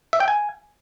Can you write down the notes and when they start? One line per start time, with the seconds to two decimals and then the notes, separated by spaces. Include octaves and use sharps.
0.13 E5
0.20 G5
0.28 G#5